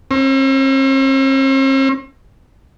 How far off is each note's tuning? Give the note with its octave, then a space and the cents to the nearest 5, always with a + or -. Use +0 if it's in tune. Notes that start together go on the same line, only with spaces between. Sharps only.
C4 +45